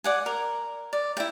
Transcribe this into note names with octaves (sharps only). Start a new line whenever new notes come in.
D5 F#5 G#5
A#4
D5
E4 G5